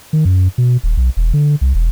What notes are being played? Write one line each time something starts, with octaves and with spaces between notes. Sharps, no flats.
D#3
F#2
B2
D#1
B1
E1
D3
C2
E1